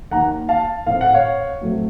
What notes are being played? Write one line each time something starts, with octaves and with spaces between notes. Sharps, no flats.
D#2 D#3 A#3 F#5 A#5
F5 A5
A2 A3 C4 F5
F#5
C#5 F5
A2 F#3 A3 C4